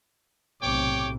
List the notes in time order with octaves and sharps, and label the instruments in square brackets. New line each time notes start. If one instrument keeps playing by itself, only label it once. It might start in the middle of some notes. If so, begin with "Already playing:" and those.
[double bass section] B1 A2 C3 [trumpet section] C#5 G5 D6